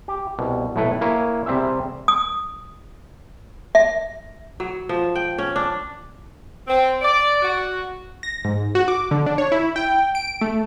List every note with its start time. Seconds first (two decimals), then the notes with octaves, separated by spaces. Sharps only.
0.08 G4
0.39 C2 B2
0.76 B1 A2 A3 E4 A4 B4
1.01 A#3 E4 C#5 G#5
1.46 C3 G3 C4 G4 G#4 E5
2.08 D#6
3.75 E5
4.60 F#3
4.89 F3
5.15 G5
5.38 C#4
5.56 D4
6.68 C4
7.01 D5
7.42 F#4
8.23 A#6
8.45 G#2
8.75 F#4
8.88 D6
9.11 D3
9.26 D4
9.38 C#5
9.52 E4
9.76 G5
10.15 D7
10.41 A3